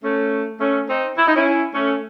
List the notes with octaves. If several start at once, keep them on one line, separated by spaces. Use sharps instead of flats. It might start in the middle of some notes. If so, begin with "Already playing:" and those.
A3 C#4
A3 C#4
C4 D#4
E4
D#4
C#4 E4
A3 C#4